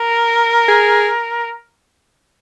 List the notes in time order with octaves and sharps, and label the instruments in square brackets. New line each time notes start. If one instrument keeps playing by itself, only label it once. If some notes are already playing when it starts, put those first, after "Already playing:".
Already playing: [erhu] A#4
[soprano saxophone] G#4